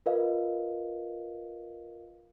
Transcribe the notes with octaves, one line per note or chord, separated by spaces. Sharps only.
F4 A#4 B4 D#5 F5